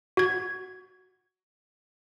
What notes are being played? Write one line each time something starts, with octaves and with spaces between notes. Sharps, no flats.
F#4 G#6